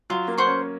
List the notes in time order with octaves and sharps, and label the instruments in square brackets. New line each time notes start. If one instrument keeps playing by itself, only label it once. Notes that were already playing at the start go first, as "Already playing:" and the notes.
[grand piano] F#3 [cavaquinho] F4
[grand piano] A#3
[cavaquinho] C5 F#5 C#6
[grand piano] C#4